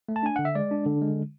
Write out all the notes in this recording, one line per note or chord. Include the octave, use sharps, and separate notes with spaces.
A3
A5
D4 G#5
D3 F#5
E5
G#3 D5
D4
D3
G#3